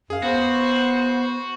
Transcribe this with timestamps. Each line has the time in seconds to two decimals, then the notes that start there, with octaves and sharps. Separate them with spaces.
0.10 F#2 G#4 F5
0.22 B3 F#4 C5